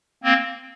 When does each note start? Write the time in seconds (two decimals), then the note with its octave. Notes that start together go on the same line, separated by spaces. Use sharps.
0.24 A#3 C4